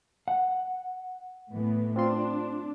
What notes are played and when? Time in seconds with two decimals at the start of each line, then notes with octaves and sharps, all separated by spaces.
0.28 F#5
1.50 A2 E3 B3
1.96 C4 D4 F4 C6